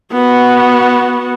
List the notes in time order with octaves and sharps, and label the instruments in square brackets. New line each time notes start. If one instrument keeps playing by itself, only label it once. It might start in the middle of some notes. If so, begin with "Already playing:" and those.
[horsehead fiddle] B3 F#4